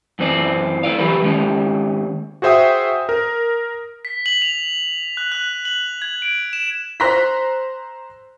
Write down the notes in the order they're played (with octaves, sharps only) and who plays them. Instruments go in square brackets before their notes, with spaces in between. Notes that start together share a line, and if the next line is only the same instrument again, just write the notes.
[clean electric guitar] F#2 E3 C4 D5
E4 D5 F5
E3 F#3 G4 A#4 B4
D#3 G#3 C#4 G4
[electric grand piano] F#4 G#4 C5 E5 G5 D#6
A#4
[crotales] B6
F#7
F7
F#6
F#6
F#7
G#6
D7
E7
[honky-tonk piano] C5 A#5 C6 F#6 A#6 B6